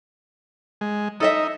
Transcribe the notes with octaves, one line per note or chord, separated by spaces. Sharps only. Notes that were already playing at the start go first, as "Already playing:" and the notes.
G#3
D#4 A4 D#5 E5